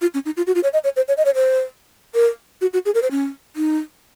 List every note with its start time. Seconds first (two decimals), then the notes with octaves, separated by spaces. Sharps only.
0.01 F4
0.14 C#4
0.25 D#4
0.37 F4
0.47 F#4
0.55 F4
0.63 C#5
0.73 D#5
0.84 C#5
0.96 C5
1.08 C#5
1.17 D#5
1.25 C#5
1.35 C5
2.14 A#4
2.61 F#4
2.73 F#4
2.85 G#4
2.94 A#4
3.02 C5
3.11 C#4
3.56 D#4